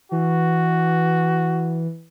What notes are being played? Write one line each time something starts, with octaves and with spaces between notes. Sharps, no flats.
E3 F#4